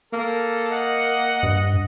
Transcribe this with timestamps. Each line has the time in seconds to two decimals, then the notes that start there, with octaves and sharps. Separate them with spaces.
0.13 A#3 A4
0.72 D#5 F#5
1.43 G2